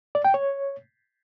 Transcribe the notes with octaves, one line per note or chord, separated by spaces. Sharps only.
D5
G5
C#5